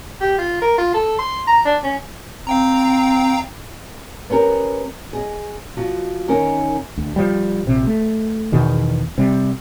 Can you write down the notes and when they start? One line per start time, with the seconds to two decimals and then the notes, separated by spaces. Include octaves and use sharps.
0.21 G4
0.38 F4
0.62 A#4
0.78 F4
0.94 A4
1.19 C6
1.47 A#5
1.65 D4
1.83 C#4
2.47 C4 F5 G5 A#5
4.30 B3 C#4 G4 A#4
5.13 G#4 D#5
5.77 F3 F#4
6.28 D#3 C#4 D#4 A#4
6.97 D2
7.16 F3 G3
7.66 A#1 C3
7.87 A3
8.52 E2 B2 D#3
9.18 C3 G3